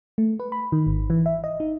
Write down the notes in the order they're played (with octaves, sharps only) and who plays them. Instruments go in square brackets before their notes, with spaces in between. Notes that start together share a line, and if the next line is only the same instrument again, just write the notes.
[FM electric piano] A3
B4
B5
D#3
G#1
E3
E5
D#5
D#4